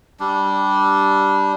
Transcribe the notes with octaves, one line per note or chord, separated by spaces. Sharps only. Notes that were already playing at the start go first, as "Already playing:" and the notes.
G3 D4